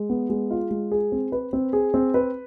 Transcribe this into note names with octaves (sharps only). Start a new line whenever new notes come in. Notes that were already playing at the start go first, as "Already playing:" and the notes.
Already playing: G#3
B3
G#3
F4
G#3
G#4
C4
B4
C4
G#4
C4
B4